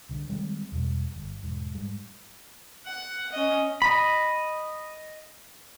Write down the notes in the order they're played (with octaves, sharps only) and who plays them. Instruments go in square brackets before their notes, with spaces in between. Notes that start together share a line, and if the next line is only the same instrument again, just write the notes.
[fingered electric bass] C2 D3
D#3 G3 G#3 C4
E2 B2 G3
G1
E1 G#2
G#2 G3
[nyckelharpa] F#5
C#4 D#5
[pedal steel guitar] D#5 B5